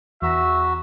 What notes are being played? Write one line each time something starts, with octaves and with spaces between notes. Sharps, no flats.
E2 F#4 E5 A#5